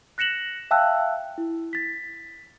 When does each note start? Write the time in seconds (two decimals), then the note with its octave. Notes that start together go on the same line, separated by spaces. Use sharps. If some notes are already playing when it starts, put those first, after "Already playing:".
0.18 F#6 A#6 C#7 E7 F#7
0.71 E5 F5 G5 A5 E6 F#6
1.38 E4
1.73 A6 B6